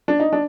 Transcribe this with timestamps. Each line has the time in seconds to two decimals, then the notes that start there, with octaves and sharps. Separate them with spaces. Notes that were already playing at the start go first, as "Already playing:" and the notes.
0.08 D4
0.20 D#4
0.33 D4